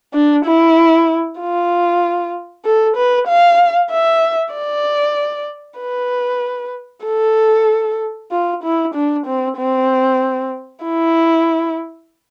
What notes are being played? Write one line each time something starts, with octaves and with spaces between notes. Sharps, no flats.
D4
E4
F4
A4
B4
F5
E5
D5
B4
A4
F4
E4
D4
C4
C4
E4